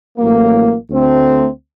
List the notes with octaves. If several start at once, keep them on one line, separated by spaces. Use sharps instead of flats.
A1 A2 F#3 A#3
D2 D3 A3 C4